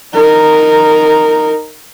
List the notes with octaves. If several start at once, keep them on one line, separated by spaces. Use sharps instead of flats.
D#4 A#4